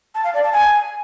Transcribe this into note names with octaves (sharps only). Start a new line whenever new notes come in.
A5
F5
D5
A5
G#5